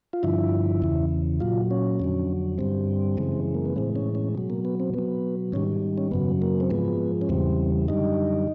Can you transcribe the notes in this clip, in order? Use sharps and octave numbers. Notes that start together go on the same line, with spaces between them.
F4
G2 D3 F3 E4
E2 C#3 E3
A#2 F#3 F4
C#4
F2 D3 F#3
G2 D3 G3 C4
F#2 C#3 E3 G#3
A#3
B3
A2 E3 G#3 C4
C#4
C#4
B2 F#3
A#3
B3
C4
B2 F#3 B3
G#2 D#3 G3 C#4
C#4
F#2 C#3 F#3 B3
A#3
C4
G#2 F3 G#3 B3
C#4
E2 C#3 E3 G3 C4
F#2 D3 G3 D#4